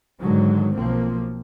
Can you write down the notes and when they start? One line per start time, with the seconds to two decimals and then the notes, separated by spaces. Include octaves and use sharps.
0.20 G#2 D3 D#3 F#3 G#3
0.74 B1 F3 A#3 C4